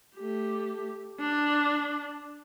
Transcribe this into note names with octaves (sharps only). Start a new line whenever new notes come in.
A3 G4
D4